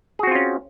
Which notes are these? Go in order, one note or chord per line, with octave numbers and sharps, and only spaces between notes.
C4 C#4 F4 F#4 G#4